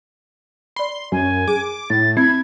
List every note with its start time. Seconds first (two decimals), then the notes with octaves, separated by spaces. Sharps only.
0.76 D5 B5 C6
1.12 F#2 G#5
1.48 G#4 D6
1.90 A2 A6
2.17 C4 E4 G#6